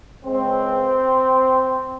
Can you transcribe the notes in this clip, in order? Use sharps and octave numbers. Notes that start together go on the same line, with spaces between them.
C#2 C#3 G#3 C4